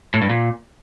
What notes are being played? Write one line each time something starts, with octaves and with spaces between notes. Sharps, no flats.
A2
G2
A#2